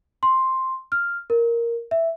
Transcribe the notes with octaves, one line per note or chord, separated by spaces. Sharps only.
C6
F6
A#4
E5